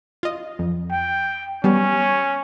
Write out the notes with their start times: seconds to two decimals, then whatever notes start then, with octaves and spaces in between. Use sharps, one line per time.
0.23 F4 D#5
0.59 F2
0.91 G5
1.64 G3 B3 C#4 G4